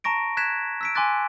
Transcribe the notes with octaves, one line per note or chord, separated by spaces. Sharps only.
A5 A#5 C#6 A#6 D7
F#6 G#6 B6 E7
E6 B6 D7
G#5 C6 D6 F#6 A6